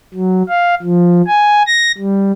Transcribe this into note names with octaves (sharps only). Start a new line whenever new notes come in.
F#3
F5
F3
G#5
A#6
G3